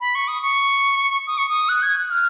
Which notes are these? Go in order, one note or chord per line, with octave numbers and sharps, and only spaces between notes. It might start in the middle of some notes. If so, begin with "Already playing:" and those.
B5
C#6
D#6
C#6
D#6
C#6
D#6
F#6
G#6
F#6
F6